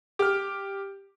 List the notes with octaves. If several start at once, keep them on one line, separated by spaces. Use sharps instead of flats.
G4 F6